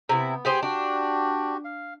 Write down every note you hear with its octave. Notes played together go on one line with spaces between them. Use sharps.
C3 B3 E4
G4 G#4 C5
D4 F#4 G4
F5